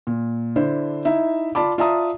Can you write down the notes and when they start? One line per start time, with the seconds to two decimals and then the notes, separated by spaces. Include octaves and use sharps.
0.07 A#2
0.56 D3 D4 E4 C5
1.05 D#4 E4 E5
1.55 F4 D5 A5 B5 D6
1.78 F4 D5 E5 A5 A#5 D#6